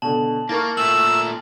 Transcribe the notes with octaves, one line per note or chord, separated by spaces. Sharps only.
B2 D3 A5 F#7
A#3 E4 A#4 C#6 F6 A6 A#6
A#2 A3 E6 F#7